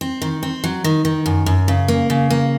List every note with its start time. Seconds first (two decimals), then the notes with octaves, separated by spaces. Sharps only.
0.01 C4
0.22 D#3
0.43 C4
0.64 F#3
0.84 D#3
1.05 D#3
1.26 F#2
1.46 F#2
1.68 C#3
1.88 A#3
2.10 C#3
2.30 A#3